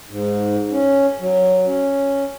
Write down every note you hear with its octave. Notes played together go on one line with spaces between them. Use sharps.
G#2
C#4
F#3
C#4